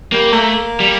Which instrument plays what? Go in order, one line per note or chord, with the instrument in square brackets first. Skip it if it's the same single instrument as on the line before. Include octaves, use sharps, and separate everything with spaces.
[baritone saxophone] G3 [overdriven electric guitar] A#3
[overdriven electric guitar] A3 [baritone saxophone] A#3
[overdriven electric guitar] G3